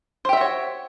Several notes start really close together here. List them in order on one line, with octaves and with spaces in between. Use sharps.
C5 G4 E5 F#4 C#5